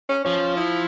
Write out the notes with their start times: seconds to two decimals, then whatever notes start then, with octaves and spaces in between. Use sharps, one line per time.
0.09 C#4
0.25 F3 C#4
0.57 E4